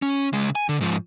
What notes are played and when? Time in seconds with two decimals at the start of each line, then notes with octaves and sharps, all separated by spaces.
0.02 C#4
0.33 C#3 G#3
0.55 G#5
0.69 D3
0.81 G#2 F3